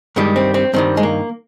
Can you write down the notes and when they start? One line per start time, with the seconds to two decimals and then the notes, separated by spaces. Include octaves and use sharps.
0.16 G2 D#3 G3 G#3
0.36 C4
0.54 C4
0.73 G2 D#3 G3 C4
0.97 G#3
1.03 A#3